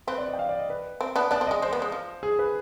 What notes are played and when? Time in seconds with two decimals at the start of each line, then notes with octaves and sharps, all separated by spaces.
0.07 C4 B4
0.18 D5
0.29 D#5
0.33 G5
0.39 F5
0.49 D5
0.59 D#5
0.70 B4
1.01 C4
1.16 B3 D4
1.31 B3 D4 D5
1.41 C4
1.47 G#3 D#5
1.62 G#3 C5
1.73 B3
1.82 G#3
1.92 F3
2.23 G#4
2.39 B4